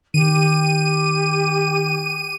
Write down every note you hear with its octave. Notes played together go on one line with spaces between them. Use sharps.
D#3 G4 D#7